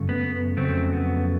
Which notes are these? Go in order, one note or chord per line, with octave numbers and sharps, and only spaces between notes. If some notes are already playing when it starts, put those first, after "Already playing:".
Already playing: F#2 C#3 F#3 A3
B3
F2 C#3 F#3 A3 C4
B3